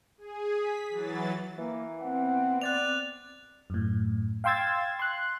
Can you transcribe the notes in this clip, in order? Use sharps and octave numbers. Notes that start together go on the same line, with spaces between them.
G#4
B6
E3 F#3 A6
E3 A#3
B3 C4 F#5
D5 F#6 A6 F7
F#2 A2
F5 G5 C6 E6 G#6 A6
C6 F#6